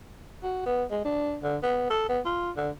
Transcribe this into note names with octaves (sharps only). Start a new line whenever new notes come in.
F#4
B3
G#3
D4
D3
B3
A4
B3
F4
D3